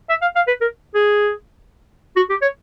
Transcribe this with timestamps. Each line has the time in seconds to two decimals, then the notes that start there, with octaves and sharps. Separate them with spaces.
0.09 E5
0.22 F5
0.36 F5
0.47 B4
0.61 A#4
0.95 G#4
2.16 F#4
2.29 G4
2.42 C#5